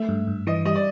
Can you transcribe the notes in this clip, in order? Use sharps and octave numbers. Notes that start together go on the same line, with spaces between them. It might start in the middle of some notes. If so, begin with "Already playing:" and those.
Already playing: A3 E5
G2
G2
E3 D#5
G3 D#5
D5